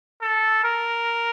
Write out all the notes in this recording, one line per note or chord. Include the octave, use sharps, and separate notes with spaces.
A4
A#4